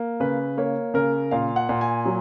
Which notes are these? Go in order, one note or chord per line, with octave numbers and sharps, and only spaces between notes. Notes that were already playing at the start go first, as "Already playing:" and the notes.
Already playing: A#3
C#3 B4
A#3 C#5
C#3 A#4
A#2 F5
F#5
A#2
G#5
F#3